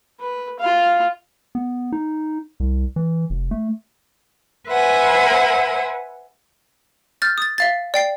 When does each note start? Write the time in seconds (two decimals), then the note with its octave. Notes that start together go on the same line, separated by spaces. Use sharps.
0.20 B4
0.59 F4 F5
1.55 B3
1.92 D#4
2.60 C2
2.96 E3
3.30 F1
3.51 A3
4.69 B4 C5 E5 F#5 G#5
7.22 F6 G6 A6
7.38 D#6 A6
7.58 E5 F5 A6
7.94 D5 G5 C7